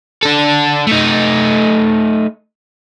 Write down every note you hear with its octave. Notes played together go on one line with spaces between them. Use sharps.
D4 A4
A3 D#4